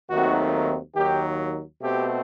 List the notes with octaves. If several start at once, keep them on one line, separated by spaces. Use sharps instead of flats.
D#2 D#3 F#3 A3 C4 F#4
D#2 D#3 F#3 G4
B2 A3 C4 G4